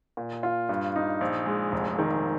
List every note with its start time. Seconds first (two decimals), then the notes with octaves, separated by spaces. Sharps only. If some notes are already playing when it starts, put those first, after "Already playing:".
0.17 A#2
0.43 F4
0.69 G2
0.96 D#4
1.21 A#1
1.46 G#3
1.72 F1
1.99 D#3